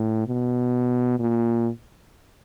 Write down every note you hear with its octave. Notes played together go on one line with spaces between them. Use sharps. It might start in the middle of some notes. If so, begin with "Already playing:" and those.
Already playing: A2
B2
A#2